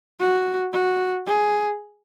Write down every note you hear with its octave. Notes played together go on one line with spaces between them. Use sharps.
F#4
F#4
G#4